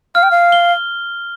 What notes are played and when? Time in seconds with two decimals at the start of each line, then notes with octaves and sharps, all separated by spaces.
0.15 F5 F6
0.23 G5
0.31 F5
0.52 G7